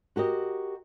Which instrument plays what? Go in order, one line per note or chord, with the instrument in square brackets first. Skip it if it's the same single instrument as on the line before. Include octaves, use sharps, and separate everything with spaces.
[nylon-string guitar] F#4 G4 A#4 D#5